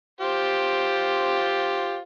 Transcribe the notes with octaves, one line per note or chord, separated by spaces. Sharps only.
F4 G4 C5